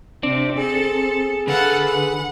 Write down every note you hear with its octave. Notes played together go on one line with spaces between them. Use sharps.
C3 C4 D4 D6
G#4 A4
D3 A4 B4 F5 F#5
F#5